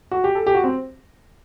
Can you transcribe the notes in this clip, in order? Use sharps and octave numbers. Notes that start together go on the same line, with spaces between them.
F#4
G4
A4
G4
F#4
C4